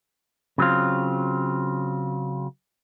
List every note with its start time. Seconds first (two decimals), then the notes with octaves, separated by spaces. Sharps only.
0.58 C#3 F#3 C4 F4